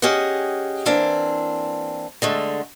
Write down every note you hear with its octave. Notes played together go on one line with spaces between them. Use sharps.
C#4 G4 G#4 D#5 F#5
E3 A#3 C4 D4
D3 G#3 A3